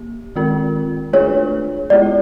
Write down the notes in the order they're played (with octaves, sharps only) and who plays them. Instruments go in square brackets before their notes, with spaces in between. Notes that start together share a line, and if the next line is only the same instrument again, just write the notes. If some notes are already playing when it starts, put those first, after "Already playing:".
Already playing: [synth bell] A#3 G4
D#3 G#3 C4 F4 A#4
[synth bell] A3 D4 F4 G#4 B4 [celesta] C#5
[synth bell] G#3 B3 E4 G4 [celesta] D5